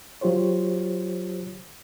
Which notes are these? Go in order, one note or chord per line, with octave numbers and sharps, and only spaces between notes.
F#3 F4 G4 C5 C#5